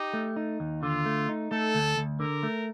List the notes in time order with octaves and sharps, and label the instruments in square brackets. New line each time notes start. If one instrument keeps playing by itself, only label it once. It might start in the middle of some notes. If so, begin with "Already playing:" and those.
Already playing: [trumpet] D#4 [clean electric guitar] G4
[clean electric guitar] A3
D#4
D#2
[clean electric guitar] D3 [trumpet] F4
[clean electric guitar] A3
D#4
[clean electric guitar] A3 [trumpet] A4
[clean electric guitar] D2
D2
[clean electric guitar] D3 [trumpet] A#4
[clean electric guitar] A3